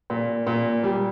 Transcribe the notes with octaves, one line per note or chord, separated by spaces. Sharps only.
A#2
A#2
G3